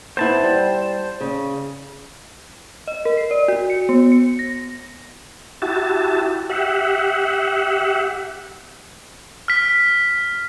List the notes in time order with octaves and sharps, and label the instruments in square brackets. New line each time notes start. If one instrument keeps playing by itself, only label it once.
[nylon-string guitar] B3 E4 [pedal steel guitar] C5 A5
[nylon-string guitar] G3
C#3
[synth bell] D#5
A#4
C7
D5
F#4
C#7
B3
C#7
A#6
[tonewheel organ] E4 F#4 G4 A5
G4 E5 F#5
[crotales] F6 B6